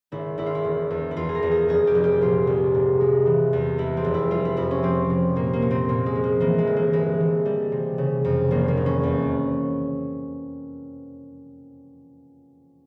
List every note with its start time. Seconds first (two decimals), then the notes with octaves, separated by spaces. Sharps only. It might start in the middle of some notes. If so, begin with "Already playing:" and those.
0.12 G#1 E4
0.38 G#1 E4
0.46 F4
0.55 E4
0.64 E1
0.91 E2
1.11 E4
1.16 E2 F4
1.29 G#4
1.35 A#4
1.43 E2
1.51 G#4
1.69 F1 G#4
1.87 G4
1.95 F1
2.04 G4
2.21 A#2 F4
2.47 C2
2.75 G#2
3.01 G#3
3.26 E3
3.53 E2
3.78 G#3 E4
3.97 C4
4.05 F1
4.14 E4
4.30 G3 F4
4.45 E4
4.57 F2 E4
4.71 C#4
4.83 F3 C4
5.10 C3
5.36 A#2 A#3
5.53 A#3
5.62 A#2
5.71 C4
5.89 A#2 A#3
6.06 G#3
6.15 F3
6.24 A#3
6.40 E3 A#3
6.58 G#3
6.67 G1
6.76 A#3
6.93 E3 G#3
7.20 E3
7.45 G3
7.72 C3
7.98 C#3
8.24 F2
8.51 G#1 A#3
8.68 A#3
8.77 G#1
8.86 C#4
9.03 E2